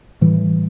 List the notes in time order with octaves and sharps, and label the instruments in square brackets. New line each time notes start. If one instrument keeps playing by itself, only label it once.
[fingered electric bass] A2 E3 G3